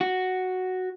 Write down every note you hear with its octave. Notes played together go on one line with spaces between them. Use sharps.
F#4